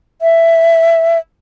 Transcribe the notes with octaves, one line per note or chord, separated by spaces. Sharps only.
E5